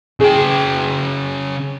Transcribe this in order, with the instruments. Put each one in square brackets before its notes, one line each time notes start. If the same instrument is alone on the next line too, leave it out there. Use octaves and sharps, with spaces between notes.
[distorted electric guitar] C#3 G5 [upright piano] G#4